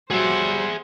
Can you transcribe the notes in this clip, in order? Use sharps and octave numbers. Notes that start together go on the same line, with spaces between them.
F#3 G3 G#4 C5 E5 F#5